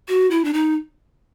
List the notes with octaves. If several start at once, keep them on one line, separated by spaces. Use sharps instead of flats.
F#4
E4
D4
D#4